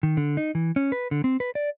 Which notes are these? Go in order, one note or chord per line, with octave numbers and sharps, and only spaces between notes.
D#3
D3
D#4
E3
C#4
B4
D3
C4
B4
D5